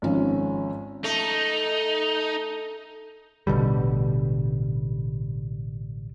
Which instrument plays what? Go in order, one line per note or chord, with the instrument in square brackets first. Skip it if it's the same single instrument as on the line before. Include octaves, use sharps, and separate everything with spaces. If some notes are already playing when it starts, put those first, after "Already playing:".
[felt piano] G#1 F3 C#4
[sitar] A3 [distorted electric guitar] D#4
[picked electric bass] A1 B2 D3 G3